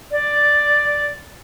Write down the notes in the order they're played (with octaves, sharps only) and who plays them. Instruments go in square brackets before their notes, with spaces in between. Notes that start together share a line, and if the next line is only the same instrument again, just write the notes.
[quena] D5